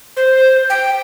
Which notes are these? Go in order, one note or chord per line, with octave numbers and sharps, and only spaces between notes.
C5
G5